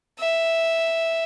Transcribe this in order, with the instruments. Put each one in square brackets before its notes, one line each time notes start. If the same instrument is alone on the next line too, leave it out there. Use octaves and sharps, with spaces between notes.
[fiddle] E5